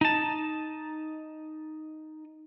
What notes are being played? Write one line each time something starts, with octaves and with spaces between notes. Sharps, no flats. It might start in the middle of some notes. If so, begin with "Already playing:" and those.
D#4 A5